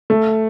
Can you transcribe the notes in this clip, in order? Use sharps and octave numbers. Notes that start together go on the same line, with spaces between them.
A3